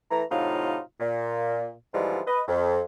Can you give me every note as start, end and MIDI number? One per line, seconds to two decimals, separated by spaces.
0.11 0.23 52
0.11 0.23 57
0.11 0.23 82
0.31 0.79 45
0.31 0.79 48
0.31 0.79 54
0.31 0.79 63
0.31 0.79 65
1.00 1.71 46
1.94 2.21 44
1.94 2.21 50
1.94 2.21 52
1.94 2.21 53
1.94 2.21 55
1.94 2.21 56
2.27 2.42 71
2.27 2.42 75
2.48 2.82 41